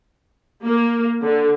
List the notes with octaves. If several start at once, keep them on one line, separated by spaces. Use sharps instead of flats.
A#3
D3